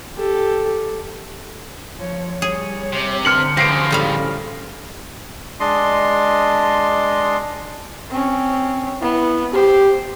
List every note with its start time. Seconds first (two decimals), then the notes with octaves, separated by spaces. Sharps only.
0.17 G4 A4
1.97 F3 C#5
2.42 G3 G#4 C#5
2.92 C3
3.25 D3 C5 F6 C#7 F#7
3.57 C#3 F3 G4 A#6 C7 D7
3.91 A2 G3 F5
5.60 G#3 D4 D#5 C6
8.10 C4 C#4
9.02 B3 E4
9.54 G4 C5